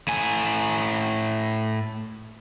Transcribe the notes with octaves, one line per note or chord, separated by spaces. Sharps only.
A2 G#5